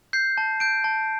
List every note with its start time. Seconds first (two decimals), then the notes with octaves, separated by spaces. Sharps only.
0.13 G6 C7
0.38 A5
0.60 G6 D7
0.84 A5